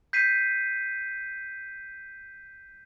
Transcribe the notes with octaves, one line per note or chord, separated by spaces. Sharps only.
G6 B6 C7 D#7